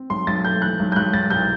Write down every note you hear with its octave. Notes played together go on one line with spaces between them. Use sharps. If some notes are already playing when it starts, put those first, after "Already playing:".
Already playing: C4
B1 C6
B1 A6
A3 G6
E3 F#6
B1
G6
B1 F#6
B1 A6
C2 G6